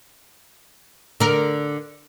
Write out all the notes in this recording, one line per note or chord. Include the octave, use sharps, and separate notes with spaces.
D3 A#4